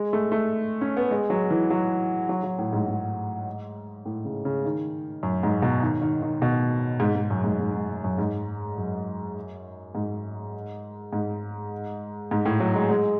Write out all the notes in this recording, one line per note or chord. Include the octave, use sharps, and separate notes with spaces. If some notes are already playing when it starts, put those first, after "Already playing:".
Already playing: G#3
A3
A3
C#4
B3
G#3
F#3
E3
F#3
F#3
F#3
A2
G#2
G#2
A2
C#3
C#3
D#3
F#2
G#2
B2
D#3
D#3
D#3
B2
G#2
G#2
F#2
G#2
G#2
G#2
F#2
G#2
F#2
G#2
G#2
G#2
A2
F#3
G#3
G#3